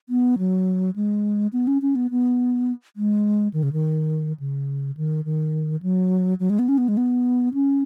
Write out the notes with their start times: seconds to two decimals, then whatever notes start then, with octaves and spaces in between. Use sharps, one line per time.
0.09 B3
0.39 F#3
0.96 G#3
1.53 B3
1.67 C#4
1.82 C#4
1.95 B3
2.11 B3
2.96 G#3
3.53 D#3
3.63 C#3
3.73 D#3
4.40 C#3
4.97 D#3
5.25 D#3
5.82 F#3
6.40 F#3
6.50 G#3
6.59 B3
6.69 C#4
6.78 B3
6.88 G#3
6.97 B3
7.54 C#4